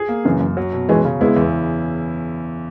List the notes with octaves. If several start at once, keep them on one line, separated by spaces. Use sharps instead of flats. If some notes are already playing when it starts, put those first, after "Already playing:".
Already playing: G#4
A#3
F#2 C#3 E3
F#2
F#3
B2
E3 G#3 C#4
C#3
G#3 B3 E4
E2